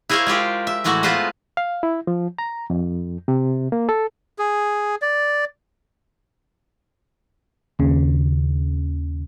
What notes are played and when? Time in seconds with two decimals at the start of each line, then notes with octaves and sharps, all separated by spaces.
0.09 E4 G#4 A#4 C5 C#5 F5
0.27 G#3 F4 G4 G#4
0.67 E5
0.84 A2 E3 G#3 A3 F#4 F#5
1.03 B3 F4 B4 C5 D#5
1.57 F5
1.83 E4
2.07 F3
2.38 A#5
2.70 F2
3.28 C3
3.72 A#3
3.89 A4
4.39 G#4
5.02 D5
7.79 D#2 C#3